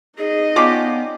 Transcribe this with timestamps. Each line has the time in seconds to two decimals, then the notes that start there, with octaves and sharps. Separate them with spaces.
0.18 D#4 G#4 D#5
0.56 B3 C#4 D4 F4 G4 F5 D6